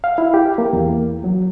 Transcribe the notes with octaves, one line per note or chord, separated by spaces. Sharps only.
F5
E4
G4
A#3
E2
F#3